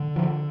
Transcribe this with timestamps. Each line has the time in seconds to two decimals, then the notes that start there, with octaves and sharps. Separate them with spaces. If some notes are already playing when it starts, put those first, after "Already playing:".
Already playing: D3
0.16 F3